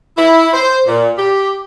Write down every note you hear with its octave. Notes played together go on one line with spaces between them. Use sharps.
E4
C5
A#2
G4